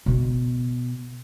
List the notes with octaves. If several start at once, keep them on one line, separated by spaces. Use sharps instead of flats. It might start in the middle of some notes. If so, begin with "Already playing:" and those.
B2 B3